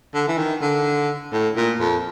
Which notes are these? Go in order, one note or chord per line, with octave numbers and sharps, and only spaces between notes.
D3
E3
D#3
D3
A2
A#2
F2